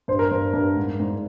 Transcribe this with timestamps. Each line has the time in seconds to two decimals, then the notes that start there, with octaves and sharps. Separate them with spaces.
0.08 G2 C5
0.19 A#4
0.31 G2 C5
0.54 G2
0.77 G#2
1.00 G#2